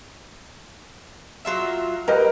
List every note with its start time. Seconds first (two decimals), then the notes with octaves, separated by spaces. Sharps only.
1.45 F#3 F4 E5
2.08 G3 A#4 B4 D#5